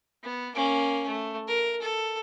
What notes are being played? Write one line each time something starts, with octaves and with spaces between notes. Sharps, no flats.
B3
A#3 C#4
A3
A#4
A4